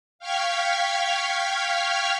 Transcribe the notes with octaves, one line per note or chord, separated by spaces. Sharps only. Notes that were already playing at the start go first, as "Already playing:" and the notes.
F5 G5 C#6 F6 G#6 B6